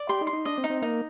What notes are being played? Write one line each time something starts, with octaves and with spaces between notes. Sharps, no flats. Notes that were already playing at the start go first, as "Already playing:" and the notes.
Already playing: D5
G4 C6
D#4
C6
D#4
D4 D#5
C4
D#4
C4
A#3 D#4